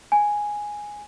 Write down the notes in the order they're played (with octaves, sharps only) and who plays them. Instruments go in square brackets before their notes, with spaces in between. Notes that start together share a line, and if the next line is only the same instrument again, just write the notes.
[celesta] G#5